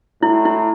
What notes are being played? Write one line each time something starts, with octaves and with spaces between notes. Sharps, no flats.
A2 E4
E4